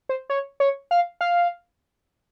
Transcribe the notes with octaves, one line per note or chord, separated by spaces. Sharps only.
C5
C#5
C#5
F5
F5